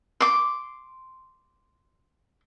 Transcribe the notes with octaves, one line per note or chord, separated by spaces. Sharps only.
C6 D6